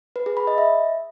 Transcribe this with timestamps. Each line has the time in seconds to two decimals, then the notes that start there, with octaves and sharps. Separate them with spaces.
0.16 B4
0.26 G#4
0.37 B5
0.47 D#5
0.58 E5